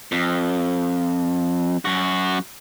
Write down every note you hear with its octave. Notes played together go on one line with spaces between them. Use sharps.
F2
F#2 F#4